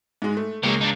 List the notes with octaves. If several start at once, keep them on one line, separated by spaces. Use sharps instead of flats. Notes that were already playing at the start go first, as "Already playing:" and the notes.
G#2 G#3
A3
C#2 G#3 A#3 C#5
D4 D#4